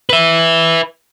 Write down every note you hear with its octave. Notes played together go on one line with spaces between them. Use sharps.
B4 E5